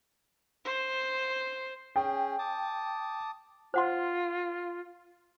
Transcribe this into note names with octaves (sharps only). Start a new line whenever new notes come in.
C5
C#4 G#4 G5
A5 D6 D#6
F4 C5 F#5 C6